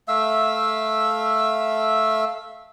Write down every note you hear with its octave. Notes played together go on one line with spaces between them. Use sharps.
A3 E5 F5 E6